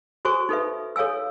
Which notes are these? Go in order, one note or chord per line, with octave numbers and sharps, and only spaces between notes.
F#4 A4 C5 G#5 C#6
D#4 A4 B4 E5
A4 C#5 F5 G#5 E6